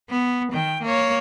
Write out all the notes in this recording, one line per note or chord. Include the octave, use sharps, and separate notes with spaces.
B3
D#3 G5
A#3 C#5